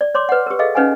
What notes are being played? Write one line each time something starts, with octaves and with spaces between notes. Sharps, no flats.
D5
C#5 C6 D6
B4 F#5
G4 A#4
G#4 A4 D#5 F5
C#4 D#4 B4 F5 F#5 G#5